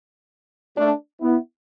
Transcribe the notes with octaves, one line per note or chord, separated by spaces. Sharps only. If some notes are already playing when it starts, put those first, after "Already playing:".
A3 D4
B3 E4